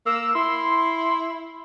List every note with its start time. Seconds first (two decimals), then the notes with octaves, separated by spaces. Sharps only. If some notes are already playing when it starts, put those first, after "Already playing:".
0.06 A#3 E6
0.35 E4 C6